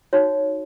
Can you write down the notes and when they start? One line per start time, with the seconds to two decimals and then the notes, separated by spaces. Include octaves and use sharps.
0.13 D#4 F#4 C#5